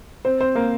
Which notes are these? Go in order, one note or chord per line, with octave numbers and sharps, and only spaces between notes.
C4 C5
C4 C5
A#3 A#4